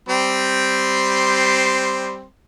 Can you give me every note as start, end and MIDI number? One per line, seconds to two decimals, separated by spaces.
0.09 2.25 55
0.09 2.25 60
0.09 2.25 84